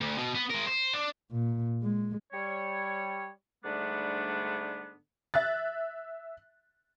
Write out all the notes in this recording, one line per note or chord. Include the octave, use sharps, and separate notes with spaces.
D2
B2
B3
G#3 A#4
C5
D4
A#2
G#3
G3 C#5
G#2 D3 G3 A3 B3 D4
E5 F#6 A6